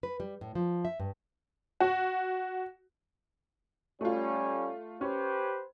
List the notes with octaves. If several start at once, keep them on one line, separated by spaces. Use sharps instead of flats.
B4
G3
A2
F3
E5
G2
F#4
G3 A3 C#4 F4
C#4 G4 B4 C5